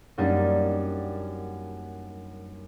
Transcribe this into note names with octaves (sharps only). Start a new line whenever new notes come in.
F#2 F#3 G3 A#3 D4 D#4